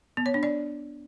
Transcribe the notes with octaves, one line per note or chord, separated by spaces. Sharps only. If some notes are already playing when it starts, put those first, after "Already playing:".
B3
C#5
D4
D5